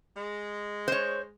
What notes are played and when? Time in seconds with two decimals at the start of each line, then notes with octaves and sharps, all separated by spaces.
0.15 G#3
0.88 C5 C#5